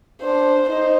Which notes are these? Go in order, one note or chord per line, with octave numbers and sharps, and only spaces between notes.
D4 C5
D#4 C5